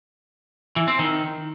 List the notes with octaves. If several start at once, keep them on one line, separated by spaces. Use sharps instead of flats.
E3
C4
D#3